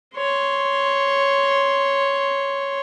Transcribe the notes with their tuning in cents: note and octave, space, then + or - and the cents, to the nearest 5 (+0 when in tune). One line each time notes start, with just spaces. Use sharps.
C#5 +0 C6 +0